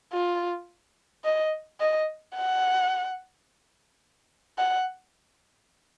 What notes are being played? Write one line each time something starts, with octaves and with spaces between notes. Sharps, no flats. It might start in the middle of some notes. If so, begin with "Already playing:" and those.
F4
D#5
D#5
F#5
F#5